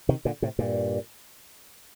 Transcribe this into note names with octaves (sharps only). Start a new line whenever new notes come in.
C3 D#3
A#2 D3
A2 C3
G2 A#2